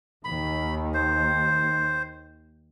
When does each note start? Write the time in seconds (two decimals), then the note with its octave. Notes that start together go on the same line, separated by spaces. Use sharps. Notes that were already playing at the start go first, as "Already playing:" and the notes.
0.24 D#2 D#3 B5
0.94 C5